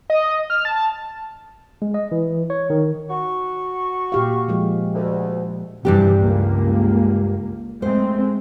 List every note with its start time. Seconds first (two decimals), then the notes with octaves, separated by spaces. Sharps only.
0.10 D#5
0.50 F6
0.65 A5
1.82 G#3
1.94 D#5
2.12 E3
2.50 C#5
2.70 D#3
3.10 F#4 C#6
4.12 A#2 G4 F5
4.48 F3 G#3
4.94 D2
5.85 G2 C3 E3 G3 D4 G4
6.19 C#2 A#3
7.82 G#3 A3 C4 C5